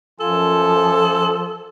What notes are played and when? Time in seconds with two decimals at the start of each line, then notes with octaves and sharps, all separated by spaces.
0.20 F#2 F3 F4 A4 G#5